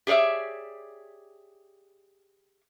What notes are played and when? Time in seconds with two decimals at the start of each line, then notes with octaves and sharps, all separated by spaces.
0.07 G4 G#4 C#5 D5 E5